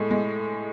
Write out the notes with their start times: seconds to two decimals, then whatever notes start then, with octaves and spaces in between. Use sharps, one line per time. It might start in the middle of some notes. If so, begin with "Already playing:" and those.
Already playing: A2 G#3
0.11 G#3